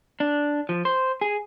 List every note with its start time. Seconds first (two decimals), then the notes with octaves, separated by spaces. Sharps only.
0.20 D4
0.69 F3
0.85 C5
1.21 G#4